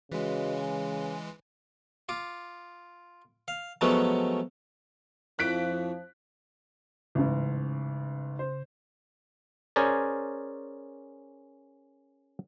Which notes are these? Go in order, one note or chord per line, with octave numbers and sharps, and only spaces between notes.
C#3 E3 G#3 F#4 B4 D#5
G#5
F4 D6
F5
F3 F#3 G#3 A3 B3 C#4
F2 A2 F3 F#6 B6 D7
A1 G#2 C#3
C5
C#4 G#4 A#4 C5 D5